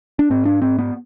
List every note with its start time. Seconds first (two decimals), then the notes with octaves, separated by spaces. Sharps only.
0.19 D4
0.30 G#2 C4
0.45 D4
0.62 C4
0.78 B3